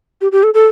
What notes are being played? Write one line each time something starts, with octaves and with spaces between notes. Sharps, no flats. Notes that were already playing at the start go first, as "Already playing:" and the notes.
G4
G4
A4
A4